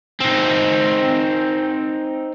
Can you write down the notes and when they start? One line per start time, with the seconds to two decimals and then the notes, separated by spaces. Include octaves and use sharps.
0.21 C4 D#4